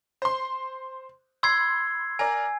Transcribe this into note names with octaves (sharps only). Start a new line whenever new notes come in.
C5 C6
B5 C6 E6 G#6 C7
A#4 D5 G#5